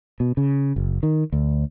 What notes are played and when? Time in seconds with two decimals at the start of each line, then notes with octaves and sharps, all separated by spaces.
0.20 B2
0.37 C#3
0.76 F#1
1.03 D#3
1.33 D2